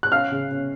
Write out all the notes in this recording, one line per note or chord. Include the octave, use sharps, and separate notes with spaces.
F#6
C#4 F5 F6
C#3
C#4